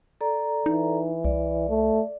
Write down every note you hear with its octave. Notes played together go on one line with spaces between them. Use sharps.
A4 D5 A#5
E3 D#4
C2 D5
A3